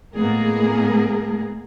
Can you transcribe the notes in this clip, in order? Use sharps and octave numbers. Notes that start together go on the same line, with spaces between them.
A2 G#3 A#3 B3 G#4 A#4